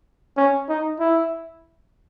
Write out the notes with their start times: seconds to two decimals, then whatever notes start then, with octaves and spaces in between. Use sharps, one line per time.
0.37 C#4
0.69 D#4
1.00 E4